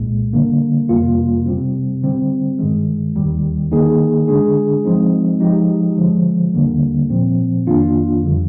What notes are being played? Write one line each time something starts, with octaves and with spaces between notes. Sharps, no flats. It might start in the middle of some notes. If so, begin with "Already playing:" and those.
Already playing: C2 A#2 G#3
D3 G3 A#3
F2 C3 G3 A#3 F4
C3 G3 C4
D3 G3 C4
G2 D#3 G#3
D#2 D#3 G3
D#3 A#3 D#4 G#4
D3 G#3 D4 G#4
F3 G#3 C4 D#4
F3 G#3 D#4 G4
D3 F3 G#3
D#2 D3 G3 A#3
A#2 F3 C4
F2 D#3 A#3 D4 F4
F2 D3 G3